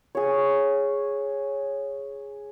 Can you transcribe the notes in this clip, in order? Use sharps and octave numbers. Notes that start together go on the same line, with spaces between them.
G#4 C#5